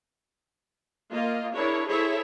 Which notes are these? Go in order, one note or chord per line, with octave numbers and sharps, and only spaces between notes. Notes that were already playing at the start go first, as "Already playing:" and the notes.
A#3 F4 D#5 F5
D4 E4 G#4 A#4 C#5
E4 G#4 A4 C5 C#5 E5